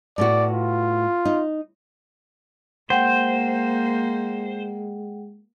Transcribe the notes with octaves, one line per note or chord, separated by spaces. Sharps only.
A2 B3 F#4 D5
F4
D#4
G#3 A#3 C5 F#5 G5